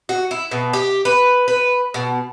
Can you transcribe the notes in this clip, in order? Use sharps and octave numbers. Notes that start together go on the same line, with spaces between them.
F#4
E4
B2
G4
B4
B4
B2